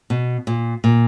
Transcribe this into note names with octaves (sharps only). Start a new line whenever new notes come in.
B2
A#2
A#2